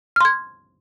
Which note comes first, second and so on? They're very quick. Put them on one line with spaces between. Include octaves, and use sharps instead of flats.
F6 C6 G#6